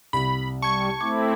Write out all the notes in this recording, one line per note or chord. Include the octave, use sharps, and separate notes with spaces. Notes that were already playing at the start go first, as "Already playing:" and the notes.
C2 B5
G3 A5 C#6 G#6
A3 C4 E4 D6 G#6